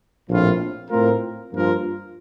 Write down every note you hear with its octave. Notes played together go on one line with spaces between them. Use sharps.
A#1 A2 F3 C4 F4
A2 A3 C4 F4 A#4
G2 F3 A#3 F4 A#4